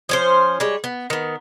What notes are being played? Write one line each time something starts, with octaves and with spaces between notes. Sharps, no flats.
F3 C#4 C5
G3 G#3 C#5
B3
D#3 B3